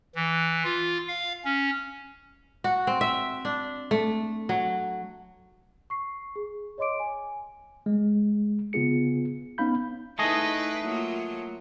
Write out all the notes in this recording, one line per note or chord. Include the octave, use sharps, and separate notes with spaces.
E3
F4
F5
C#4
F#4
C4
E5
D4
A3
F#3
C#6 C7
G#4
C#5 D#5 C6 D6 D7
G#5
G#3
C#3 B3 F4 G#4 C#7
B3 C#4 D#4 F5 B5 G6
A3 D#4 E4 G#4 B4 D#5
F#3 A#3 F4